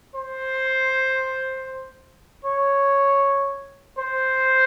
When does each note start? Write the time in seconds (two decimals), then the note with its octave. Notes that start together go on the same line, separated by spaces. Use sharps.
0.15 C5
2.45 C#5
3.98 C5